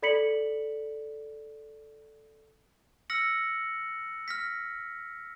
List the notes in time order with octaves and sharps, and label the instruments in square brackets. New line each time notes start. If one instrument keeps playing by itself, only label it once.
[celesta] A4 D5 B5 B6 C#7 F#7
[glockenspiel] E6 F6 A#6 C#7 F#7
F6 A#6 B6